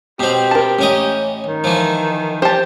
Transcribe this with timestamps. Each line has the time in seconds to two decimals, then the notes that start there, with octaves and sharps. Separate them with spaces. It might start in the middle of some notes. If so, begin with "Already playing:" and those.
0.20 B2 C4 G4
0.51 A#4 A5
0.79 A1 C#4 D#5
1.46 D#3
1.64 E3 F3
2.42 G4 C5 A5